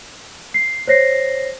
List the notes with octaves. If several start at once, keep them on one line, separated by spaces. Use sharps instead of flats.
C7
C5 C#5 A#6 C7